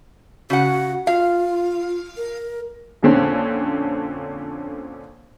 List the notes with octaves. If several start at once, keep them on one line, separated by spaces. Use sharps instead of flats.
C#3 F#4 F#5
F4 F5
A#4
F2 A#2 D3 C4 C#4